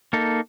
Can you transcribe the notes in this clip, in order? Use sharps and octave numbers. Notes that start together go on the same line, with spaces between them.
A#3 D#4 A4